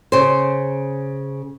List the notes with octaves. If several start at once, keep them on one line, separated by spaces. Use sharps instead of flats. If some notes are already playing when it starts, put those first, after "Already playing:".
C#3 C5